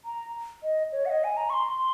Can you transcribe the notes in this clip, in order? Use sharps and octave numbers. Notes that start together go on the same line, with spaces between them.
A#5
D#5
C#5
F#5
D#5
G#5
A#5
C#6
C6
C6